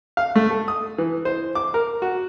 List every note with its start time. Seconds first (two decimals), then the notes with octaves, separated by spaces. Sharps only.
0.17 F5
0.35 A3
0.50 A4
0.68 D#6
0.98 E3
1.25 C5
1.55 D6
1.74 A#4
2.02 F#4